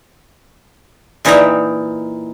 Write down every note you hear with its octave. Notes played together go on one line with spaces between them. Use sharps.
A#2 E3 D#4 E5 G5 A#5